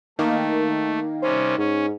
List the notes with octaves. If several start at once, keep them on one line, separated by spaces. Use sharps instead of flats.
D#3 A3 A#3 D#4
C3 G3 C#4 C5
G#2 C#4